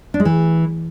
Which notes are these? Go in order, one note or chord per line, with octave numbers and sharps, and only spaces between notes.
D4
G#3
E3